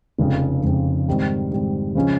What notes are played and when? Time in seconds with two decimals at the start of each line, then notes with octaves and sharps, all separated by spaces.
0.18 F1 F2 C#3 F3 C4
0.63 F1 F2 C#3 F3 C4
1.08 G#2 D#3 G3 C4
1.51 G#2 D#3 G3 C4
1.95 C#3 F3 G#3 C#4